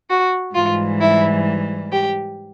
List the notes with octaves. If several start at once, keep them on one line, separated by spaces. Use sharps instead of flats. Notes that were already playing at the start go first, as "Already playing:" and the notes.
F#4
G#2 E3 G3 F4
E4
G4